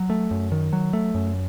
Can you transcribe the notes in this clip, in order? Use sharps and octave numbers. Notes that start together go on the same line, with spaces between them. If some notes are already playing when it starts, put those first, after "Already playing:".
Already playing: F#3
A3
F#2
D#3
F#3
A3
F#2